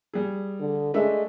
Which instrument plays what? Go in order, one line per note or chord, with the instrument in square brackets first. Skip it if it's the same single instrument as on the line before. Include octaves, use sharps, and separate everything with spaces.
[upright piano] G3 G#4
[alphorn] D3
[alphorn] G#3 [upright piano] A3 D4 E5